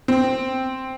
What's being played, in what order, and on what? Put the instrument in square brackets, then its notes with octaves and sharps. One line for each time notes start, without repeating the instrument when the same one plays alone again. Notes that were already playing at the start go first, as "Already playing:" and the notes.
[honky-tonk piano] C4